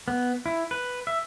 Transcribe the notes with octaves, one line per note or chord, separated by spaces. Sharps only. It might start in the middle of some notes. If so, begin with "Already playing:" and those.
B3
E4
B4
E5